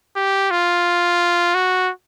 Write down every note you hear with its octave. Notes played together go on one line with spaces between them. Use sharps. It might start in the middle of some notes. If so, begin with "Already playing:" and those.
G4
F4
F#4